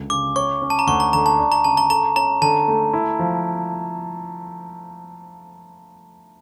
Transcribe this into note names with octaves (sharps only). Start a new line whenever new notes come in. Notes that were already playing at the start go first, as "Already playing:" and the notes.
Already playing: C#2 D3
C#3 D6
C#5 C#6
C#4
A5
A#5
D2 C#6
A#5
D3 A#5
A5
D4
A#5
C#3 A5
A#5
A4 A#5
C#4 A#5
D3 A5
A3
E4
F3